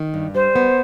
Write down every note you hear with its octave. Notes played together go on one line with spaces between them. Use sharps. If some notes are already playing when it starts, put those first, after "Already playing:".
Already playing: D#3
G2
G3 C5
B3